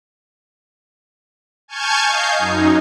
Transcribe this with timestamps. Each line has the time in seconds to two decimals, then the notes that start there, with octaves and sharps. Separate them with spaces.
1.68 G#5 A5 C#6 F6 G6 G#6
2.07 D#5 F5 G#5 G6 C7
2.38 F#2 D#4